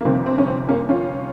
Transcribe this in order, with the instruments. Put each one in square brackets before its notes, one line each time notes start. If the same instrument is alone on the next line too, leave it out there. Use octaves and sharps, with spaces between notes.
[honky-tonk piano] A#3
G1 F2 C3 D#3 C4
C4
C#4
C4
A#3 C#4
C#4 F4